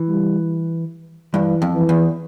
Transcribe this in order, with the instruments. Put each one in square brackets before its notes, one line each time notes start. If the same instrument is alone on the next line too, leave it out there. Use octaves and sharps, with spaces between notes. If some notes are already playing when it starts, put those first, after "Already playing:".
Already playing: [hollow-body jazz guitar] E3
[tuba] G3
[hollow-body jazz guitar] G2 [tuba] E3
[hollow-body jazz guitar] F2
[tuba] E3
[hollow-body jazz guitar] E2